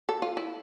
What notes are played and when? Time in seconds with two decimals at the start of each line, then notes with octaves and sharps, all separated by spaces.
0.09 A4
0.22 F4
0.37 E4